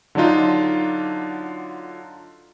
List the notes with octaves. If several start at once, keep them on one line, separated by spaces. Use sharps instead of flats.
D3 F#3 D4 D#4 F4